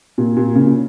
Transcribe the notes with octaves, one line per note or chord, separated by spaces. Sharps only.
A#2
A#2
C#3